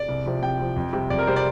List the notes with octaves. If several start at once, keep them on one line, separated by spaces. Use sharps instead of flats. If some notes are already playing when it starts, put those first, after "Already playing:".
Already playing: D5
C2
C3 F3
C2 G5
C3 F3
F2
C3 G3
F2 D5
A#4
C3 G3 C5
D5